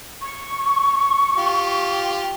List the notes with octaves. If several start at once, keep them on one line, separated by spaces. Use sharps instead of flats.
C#6
F4 G4